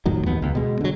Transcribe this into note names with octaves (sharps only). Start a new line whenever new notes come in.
F2 A2 D#3 F#3
D#2 B3
C#2
B2 G#3
D3 F#3